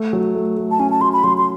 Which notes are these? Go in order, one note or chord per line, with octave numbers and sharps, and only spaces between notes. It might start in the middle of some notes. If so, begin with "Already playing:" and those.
Already playing: A3
F#3
A3
A3
A5
C#4 G#5
A5
F#3 C6
B5
F#3 C6
C6